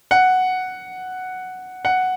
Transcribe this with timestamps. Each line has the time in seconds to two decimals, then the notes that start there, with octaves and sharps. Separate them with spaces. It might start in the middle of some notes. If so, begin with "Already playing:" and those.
0.11 F#5
1.85 F#5